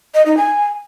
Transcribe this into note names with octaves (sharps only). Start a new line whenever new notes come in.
D#5
D#4
G#5